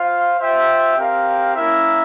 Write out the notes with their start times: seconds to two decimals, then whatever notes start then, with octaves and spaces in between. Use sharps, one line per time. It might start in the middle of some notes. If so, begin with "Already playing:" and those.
Already playing: F4 C5 F5
0.38 F4 C5 E5 G5
0.96 C4 G4 A#4 F5
1.55 A#3 C#4 E4 A#4 E5